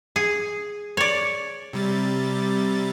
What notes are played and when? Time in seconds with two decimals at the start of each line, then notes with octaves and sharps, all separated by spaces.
0.16 G#4
0.97 C#5 D5
1.73 C3 G3 A6